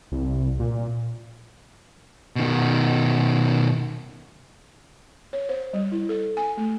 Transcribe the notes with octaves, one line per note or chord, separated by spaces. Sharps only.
C2
A#2
B2 D#3
C#5
C5
G3
E4
A4
G#5
A3